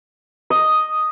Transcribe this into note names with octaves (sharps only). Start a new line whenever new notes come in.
D#5